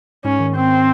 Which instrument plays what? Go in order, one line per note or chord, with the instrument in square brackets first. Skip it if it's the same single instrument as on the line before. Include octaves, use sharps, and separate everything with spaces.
[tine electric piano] G#2 [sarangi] C#4
[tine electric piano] D#3
[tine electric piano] G#2 [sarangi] C4